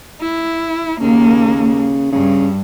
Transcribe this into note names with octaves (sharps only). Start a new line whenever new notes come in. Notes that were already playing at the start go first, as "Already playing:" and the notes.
E4
D#2 C#3 A#3
G2 C#3